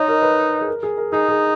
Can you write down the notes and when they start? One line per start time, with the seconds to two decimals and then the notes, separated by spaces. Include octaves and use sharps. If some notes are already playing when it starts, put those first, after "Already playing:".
Already playing: D#4 C#5 D#5
0.08 A#4
0.22 B4
0.61 G#4
0.68 A#4
0.83 G#4
0.98 A#4
1.13 D#4 G#4
1.28 G#4